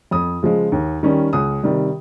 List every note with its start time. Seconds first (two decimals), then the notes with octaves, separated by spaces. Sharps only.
0.11 F2 D#6
0.43 C#3 F3 G#3
0.72 D#2
1.03 D#3 G3 C#4
1.33 C#2 D#6
1.63 C3 D#3 G3